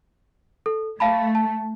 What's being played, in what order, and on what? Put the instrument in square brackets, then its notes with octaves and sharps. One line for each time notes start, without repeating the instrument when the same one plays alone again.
[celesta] A4
[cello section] A3 [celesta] F5 A5 B5
[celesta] A5